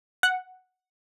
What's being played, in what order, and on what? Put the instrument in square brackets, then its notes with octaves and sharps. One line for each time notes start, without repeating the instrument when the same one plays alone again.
[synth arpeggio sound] F#5